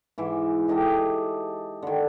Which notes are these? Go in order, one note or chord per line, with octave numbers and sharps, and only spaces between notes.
G#2 E3 E5 D6
G4 A4 D#5 E5
D3 D#3